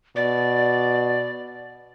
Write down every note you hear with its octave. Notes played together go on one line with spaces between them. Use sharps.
B2 D5